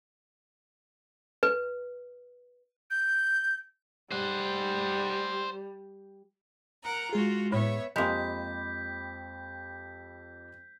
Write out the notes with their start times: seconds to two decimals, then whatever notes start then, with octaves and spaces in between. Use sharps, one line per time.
1.43 B4
2.91 G6
4.11 G3 C5 F#5
6.84 A#4 F#5 A#5
7.13 G#3 F4 F#4 G#4
7.52 A2 B3 C#5 E5
7.96 F2 G#3 A#3 G4 B5 G6 B6